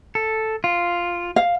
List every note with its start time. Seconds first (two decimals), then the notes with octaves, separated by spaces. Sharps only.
0.15 A4
0.64 F4
1.36 F5